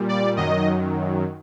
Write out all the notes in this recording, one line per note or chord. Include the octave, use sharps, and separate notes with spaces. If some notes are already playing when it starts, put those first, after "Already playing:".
Already playing: A#2 G3
D5
F#2 D#3 F#3 D#5